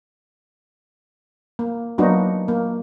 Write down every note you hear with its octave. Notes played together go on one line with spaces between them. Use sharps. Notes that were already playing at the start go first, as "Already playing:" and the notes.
A#3
F#3 A#3 B3 D4 D#4 F#4
A#3